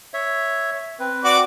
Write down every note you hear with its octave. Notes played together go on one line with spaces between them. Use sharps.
C#5 E5
C4 B4
F#4 D5 D6